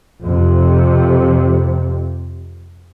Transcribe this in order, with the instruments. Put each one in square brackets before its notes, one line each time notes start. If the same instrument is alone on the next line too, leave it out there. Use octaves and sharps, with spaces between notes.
[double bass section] F2 C3